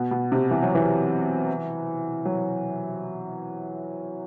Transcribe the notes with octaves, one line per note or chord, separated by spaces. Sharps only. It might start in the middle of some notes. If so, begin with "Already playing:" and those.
Already playing: B2
B2
C3
E3
F#3
E3
F#3